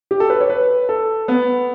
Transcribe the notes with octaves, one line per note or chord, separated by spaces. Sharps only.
G4
A4
B4
C#5
B4
A4
B3